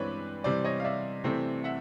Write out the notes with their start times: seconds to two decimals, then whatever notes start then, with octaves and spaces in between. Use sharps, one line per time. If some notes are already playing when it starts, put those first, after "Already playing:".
Already playing: G2 E3 G#3 C4 B4 C#5 D5
0.44 C3 E3 G3 C5 D5
0.64 C#5 D#5
0.80 F5
0.84 D5 E5
1.24 C3 E3 A3 C4
1.64 E5 F#5